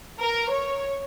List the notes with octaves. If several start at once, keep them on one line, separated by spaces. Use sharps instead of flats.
A#4
C#5